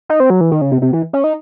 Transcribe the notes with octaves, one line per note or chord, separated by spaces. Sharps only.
D#4
C4
F#3
E3
D#3
C#3
C3
C3
E3
C#4
D#4